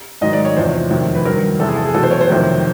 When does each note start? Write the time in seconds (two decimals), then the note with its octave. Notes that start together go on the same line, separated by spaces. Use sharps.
0.21 G#2 D#3 F#3 D#5
0.33 D5
0.45 C#5
0.57 E2 C3 F3 C5
0.90 F2 C3 D#3 F#3
1.15 B4
1.25 G2 D#3 F#3 A#4
1.59 E2 C3 E3 A4
1.68 G#4
1.77 A4
1.85 G#4
1.94 E2 B2 F#3 A4
2.03 C5
2.11 C#5
2.21 C5
2.29 F2 C3 D#3 F#3